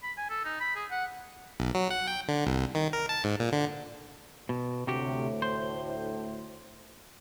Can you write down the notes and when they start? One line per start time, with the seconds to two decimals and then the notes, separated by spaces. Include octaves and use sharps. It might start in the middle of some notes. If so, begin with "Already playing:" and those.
0.03 B5
0.18 G#5
0.30 A4
0.45 D#4
0.61 B5
0.76 G#4
0.91 F#5
1.60 B1
1.75 F#3
1.90 F#5
2.07 G5
2.28 D3
2.47 C2
2.75 D#3
2.93 A#4
3.09 A5
3.24 G#2
3.40 A#2
3.52 D3
4.49 B2
4.87 D2 A2 C3 F#4 G4
5.42 C5